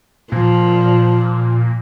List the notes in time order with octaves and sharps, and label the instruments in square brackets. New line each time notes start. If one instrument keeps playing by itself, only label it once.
[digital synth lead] A#2 [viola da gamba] F3